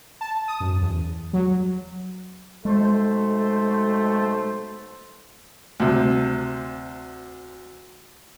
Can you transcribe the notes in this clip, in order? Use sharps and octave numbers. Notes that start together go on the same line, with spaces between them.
A5
D#6
F#2
E2
F#3
B1 G#3 A3 C5
D2 C3